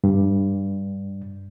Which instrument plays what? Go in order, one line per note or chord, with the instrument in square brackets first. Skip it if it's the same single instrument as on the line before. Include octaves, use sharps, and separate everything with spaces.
[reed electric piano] G2